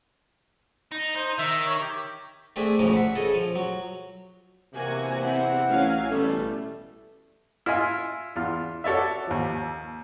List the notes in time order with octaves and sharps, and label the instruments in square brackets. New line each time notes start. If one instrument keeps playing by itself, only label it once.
[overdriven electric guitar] D#4
[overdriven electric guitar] D#4 [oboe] C5
[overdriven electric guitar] D#3 [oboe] E5
[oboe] C#5
G4
[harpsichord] A3 C4 D4 G#4 E5
D2 G#2 C#3 F3 A3
E5 F#5
C#3 G#4 A4 D#5
F3
F#3
[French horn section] E2 C3 [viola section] A#3 F#4 G#5
[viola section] C4 G4 [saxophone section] E4 F#5
[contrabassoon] A1 [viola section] F#3 F5 G#5
[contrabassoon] A1 [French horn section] B2 [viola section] G3 B3 [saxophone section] A3
[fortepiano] E4 F4 D#5 G#5
E2 F4 F6
F#4 A4 C#5 D5 E5
D#2 F3